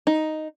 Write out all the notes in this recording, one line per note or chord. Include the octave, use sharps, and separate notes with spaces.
D#4